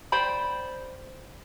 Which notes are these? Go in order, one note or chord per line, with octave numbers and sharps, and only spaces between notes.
C5 D5 G5 B5